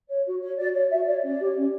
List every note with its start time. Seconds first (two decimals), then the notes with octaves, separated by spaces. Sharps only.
0.09 C#5
0.26 F#4
0.41 C#5
0.57 F#4 D5
0.74 C#5
0.90 F#4 E5
1.06 C#5 D5
1.22 C#4 D5
1.38 G4 C#5
1.55 C#4